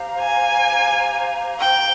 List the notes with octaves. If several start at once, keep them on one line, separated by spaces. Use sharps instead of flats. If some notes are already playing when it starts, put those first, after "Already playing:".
Already playing: G4 C5 F5 A#5
G#5
G5